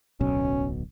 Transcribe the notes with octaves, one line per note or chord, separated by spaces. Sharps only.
D1 B1 B2 C#4